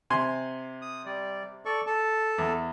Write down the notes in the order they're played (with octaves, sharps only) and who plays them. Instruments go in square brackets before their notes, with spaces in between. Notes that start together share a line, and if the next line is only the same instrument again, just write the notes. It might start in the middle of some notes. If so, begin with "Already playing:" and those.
[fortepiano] C3 G#5 C6
[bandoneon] D#6
G3 D5
A4 D5 C#6
A4 A5
[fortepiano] E2